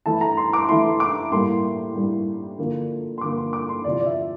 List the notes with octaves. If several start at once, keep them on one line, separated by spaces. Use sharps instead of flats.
E3 A3 E4 A5
A#5
C6
D6
E3 A3 E4 C6
D6
A2 G3 A#3 C6
A2 G3 A#3
D3 F3 A#3
C6
D3 F3 A#3 D6
C6
D6
C6
E2 C3 F3 D5
D5
E5